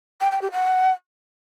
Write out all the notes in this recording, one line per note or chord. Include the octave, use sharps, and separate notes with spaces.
G5
G5
G4
F#5